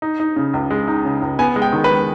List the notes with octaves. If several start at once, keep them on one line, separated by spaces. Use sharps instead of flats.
D#4
D#4
C#3
C#2
G#3
D#4
C#3
C#2
B3 G#5
G#3
G5
D#3
B4
G#3